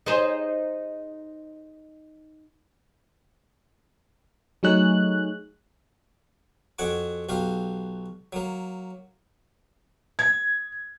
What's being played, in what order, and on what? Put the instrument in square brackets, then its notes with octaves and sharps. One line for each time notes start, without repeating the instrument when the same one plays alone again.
[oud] D#4 G#4 C5
[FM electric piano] F#3 A3 D#4 G#4 C#5 F#6
[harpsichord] F2 F#4 F#5 G#5 D6
B1 F#4 G4 F5
F#3 A#3
[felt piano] G#6